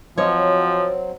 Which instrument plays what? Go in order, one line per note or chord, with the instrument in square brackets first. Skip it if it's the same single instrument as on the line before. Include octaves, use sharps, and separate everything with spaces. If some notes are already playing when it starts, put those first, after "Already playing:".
[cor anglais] F3 [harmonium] F#3 C4 [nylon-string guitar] C#5 D#5